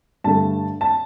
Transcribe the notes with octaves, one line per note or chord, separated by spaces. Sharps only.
G2 D3 A3 A5
A5